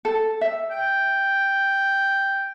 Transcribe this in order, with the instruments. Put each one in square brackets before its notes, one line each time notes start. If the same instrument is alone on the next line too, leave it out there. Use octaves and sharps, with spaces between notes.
[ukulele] A4
E5
[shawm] G5